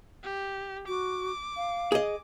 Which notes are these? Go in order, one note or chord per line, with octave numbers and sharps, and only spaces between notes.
G4
F#4 D6
F5
G#4 D#5